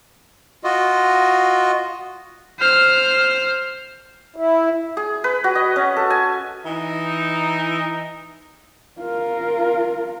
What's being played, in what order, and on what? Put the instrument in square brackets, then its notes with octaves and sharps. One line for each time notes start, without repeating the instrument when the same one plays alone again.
[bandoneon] F4 F#4 D#5
[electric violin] C5 F6
[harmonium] E4
[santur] G#4
B4
F#4
D#5
C#4
A4
G#5
[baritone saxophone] E3 [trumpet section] D#4
[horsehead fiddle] F4 A#4